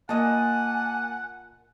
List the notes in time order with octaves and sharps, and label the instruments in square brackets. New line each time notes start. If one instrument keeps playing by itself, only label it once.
[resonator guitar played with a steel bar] A#2 D#5 [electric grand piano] A#3 A5 [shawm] F#5 [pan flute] G#5